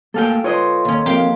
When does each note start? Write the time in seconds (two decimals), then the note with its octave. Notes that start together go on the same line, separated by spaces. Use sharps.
0.14 A3 A#3 A4 F5 G5 G#5
0.44 F4 B4 C#5 D#5 C6
0.85 D#2 C#4
1.05 F3 A#3 C4 G4 A#4 F5